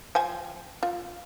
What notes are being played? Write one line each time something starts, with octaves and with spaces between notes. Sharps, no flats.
F3 G5 G#5
F4